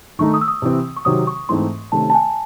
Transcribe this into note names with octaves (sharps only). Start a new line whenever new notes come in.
D#3 A3 D#4 C#6
D#6
E6
D#6
C3 E3 C4
C#6
C3 D#3 F#3 C4 D#6
C#6
G#2 E3 A3 C4 D#4 C6
C3 D#3 A3 C#4 A5
A5
G#5